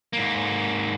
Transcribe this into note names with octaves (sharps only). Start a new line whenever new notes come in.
G#2 A#3